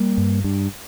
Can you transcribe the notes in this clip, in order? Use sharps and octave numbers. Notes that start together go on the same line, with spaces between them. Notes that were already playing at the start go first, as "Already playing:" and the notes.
Already playing: G3 A#3
G2
G2